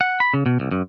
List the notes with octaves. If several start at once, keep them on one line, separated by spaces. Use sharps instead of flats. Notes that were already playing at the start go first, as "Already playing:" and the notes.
F#5
B5
C#3
B2
C2
F#2